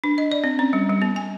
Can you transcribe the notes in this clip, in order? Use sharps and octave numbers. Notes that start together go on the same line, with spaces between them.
D4
D#5
D5
C4
C#4
G3
G3
B3
G#5